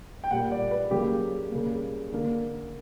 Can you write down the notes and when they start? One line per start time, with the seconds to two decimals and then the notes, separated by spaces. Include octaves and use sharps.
0.24 G5
0.31 A#2 G3 A#3 F#5
0.52 D5
0.71 B4
0.91 C#3 F#3 A#3 G4
1.51 C#3 G3 A#3
2.12 D3 A#3